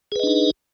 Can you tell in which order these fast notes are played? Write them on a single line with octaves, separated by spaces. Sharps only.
G#4 B4 D#5 D4 D#4